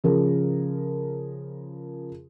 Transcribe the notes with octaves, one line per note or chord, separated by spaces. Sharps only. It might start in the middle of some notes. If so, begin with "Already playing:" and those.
C#3 F3 G#4 A#4